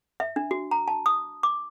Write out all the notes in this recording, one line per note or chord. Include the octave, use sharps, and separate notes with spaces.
E5
D4
F#4
A#5
A5
D#6
D6